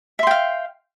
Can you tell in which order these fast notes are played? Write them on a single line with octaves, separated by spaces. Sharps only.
E5 C6 G5 F5